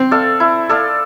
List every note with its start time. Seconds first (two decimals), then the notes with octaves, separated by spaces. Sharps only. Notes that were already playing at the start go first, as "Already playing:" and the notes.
Already playing: C4
0.11 A4 D5 F5
0.40 E4
0.69 A4 D5 F5